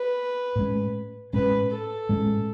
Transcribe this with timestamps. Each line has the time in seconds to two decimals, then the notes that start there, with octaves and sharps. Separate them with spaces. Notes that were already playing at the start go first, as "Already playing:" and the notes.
Already playing: B4
0.56 A2 G#3 C#4
1.33 A2 G#3 C#4 B4
1.71 A4
2.09 A2 G#3 C#4